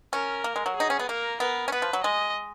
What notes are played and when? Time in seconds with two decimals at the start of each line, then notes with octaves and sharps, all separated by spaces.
0.13 C#4 A#4
0.44 A#3
0.56 G#3
0.66 F#3
0.76 D#4 G#4
0.90 C#4
0.99 B3
1.08 A#3 A#4
1.40 B3 A#4
1.68 C#4
1.72 B3 B4
1.82 F3
1.93 F#3
2.03 G#3 D#5